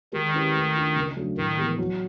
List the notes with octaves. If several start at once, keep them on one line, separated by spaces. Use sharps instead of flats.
D#3 G#3
C#4 E4 G4 B4
A3
D4 F4
C#3
F#3 A3 D4
A2 D#3
E3 G#3 B3
F#3